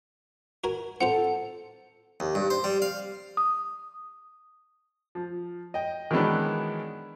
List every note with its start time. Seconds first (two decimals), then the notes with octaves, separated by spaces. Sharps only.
0.64 F#4 A#4 G#5
1.01 C4 F4 A4 C5 F#5
2.20 D#2
2.35 G2
2.50 C5
2.64 G3
2.82 F5
3.37 D#6
5.15 F3
5.74 D#5 G5
6.11 D#3 E3 F#3 G#3 B3 D4